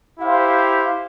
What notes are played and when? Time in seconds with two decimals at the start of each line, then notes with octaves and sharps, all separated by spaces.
0.19 E4 G4 C5 F5